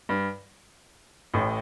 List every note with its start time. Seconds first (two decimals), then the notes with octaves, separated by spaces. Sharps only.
0.09 G2
1.34 A1 A2